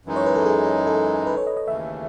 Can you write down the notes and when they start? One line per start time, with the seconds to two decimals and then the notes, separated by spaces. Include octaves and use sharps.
0.05 F#2 E3 G#3 D#4
0.16 C#5
0.26 B4
0.36 A4
0.45 G#4
0.87 A4
1.27 B4
1.37 C#5
1.47 D#5
1.57 D#5
1.67 D#2 C#3 E3 A3 E5